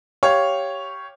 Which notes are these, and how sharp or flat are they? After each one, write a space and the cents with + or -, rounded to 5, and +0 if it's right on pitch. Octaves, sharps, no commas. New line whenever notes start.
G4 +0 C#5 +0 F5 +0